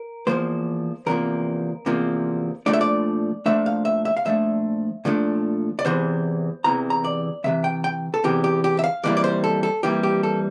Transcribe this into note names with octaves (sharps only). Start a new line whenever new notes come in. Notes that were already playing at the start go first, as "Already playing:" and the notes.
Already playing: A#4
E2 C3 F3 A#3 C5
E2 C3 F3 A#3 A#4
E2 C3 F3 A#3
A#2 F3 A3 D4 D5
E5
D5
A#2 F3 A3 D4 E5
F5
E5
E5
F5
A#2 F3 A3 D4 E5
A#2 F3 A3 D4
D5
E2 C3 E3 C5
E2 C3 E3 A#5
A#5
D5
E2 C3 E3 E5
G5
G5
A4
E2 C3 E3 G4
G4
G4
E5
F5
F2 E3 G3 A#3 E4 D5
D5
C5
A4
A4
F2 E3 G3 A#3 E4 G4
G4
A4